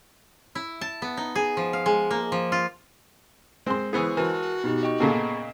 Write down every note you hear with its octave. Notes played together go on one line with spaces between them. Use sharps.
E4
A5
B3
D#4
G#4
F3
F5
G#3
A#3
F3
F4
G#3 C4 C6
E3 B3 E4 G#4 C5 C#6
E3 F#4 A#4 A5
B2 D#4 G4
D#5 G5 C#6
A#2 C#3 A#3 B3 G#4 A4